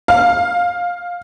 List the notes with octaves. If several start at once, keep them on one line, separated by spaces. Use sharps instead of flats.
F5